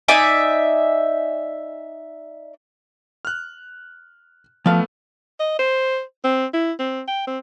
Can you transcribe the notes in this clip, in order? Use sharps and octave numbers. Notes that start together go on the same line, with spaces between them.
D#4 D5 E5 G#5
F6 F#6
F3 A3 B3 F5
D#5
C5
C4
E4
C4
G5
C4